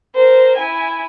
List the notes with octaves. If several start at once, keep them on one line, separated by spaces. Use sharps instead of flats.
A#4 C5
E4 G#5